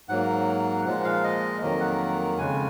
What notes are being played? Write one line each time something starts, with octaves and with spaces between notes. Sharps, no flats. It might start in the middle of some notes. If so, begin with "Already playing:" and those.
G#2 F#3 A#3 F#5
A#2 F3 G#3 F#5
F5
D#5
F2 D#3 F#3 A#3 D#5
F#5
F2 C#3 G#3 G#5